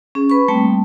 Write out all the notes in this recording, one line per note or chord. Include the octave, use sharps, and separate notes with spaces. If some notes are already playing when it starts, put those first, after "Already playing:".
C#4 G#4
B4 B5 C#6
G3 A3 A#3 C4 G5 A5